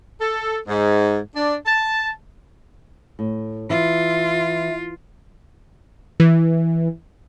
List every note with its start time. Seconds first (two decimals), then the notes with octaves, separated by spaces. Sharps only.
0.21 A4
0.68 G#2
1.36 D4
1.65 A5
3.19 A2
3.70 E3 F4 E5
6.20 E3